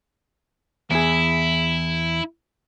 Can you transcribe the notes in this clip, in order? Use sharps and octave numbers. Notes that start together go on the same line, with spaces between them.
E2 E4 G#4